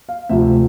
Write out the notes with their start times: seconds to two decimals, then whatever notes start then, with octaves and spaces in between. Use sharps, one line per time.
0.09 F5
0.29 D2 C3 F3 E5